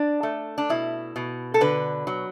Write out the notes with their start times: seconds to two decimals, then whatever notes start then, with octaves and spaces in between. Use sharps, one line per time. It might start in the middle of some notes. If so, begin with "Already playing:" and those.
Already playing: D4
0.23 A3
0.58 D4
0.69 B2 E4
1.16 B2
1.54 A4
1.61 D3 B4
2.07 F#3